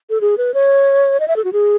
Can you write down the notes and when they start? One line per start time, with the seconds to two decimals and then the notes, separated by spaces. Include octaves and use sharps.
0.10 A4
0.21 G#4
0.38 B4
0.54 C#5
1.20 D#5
1.28 E5
1.36 A4
1.44 F#4
1.53 G#4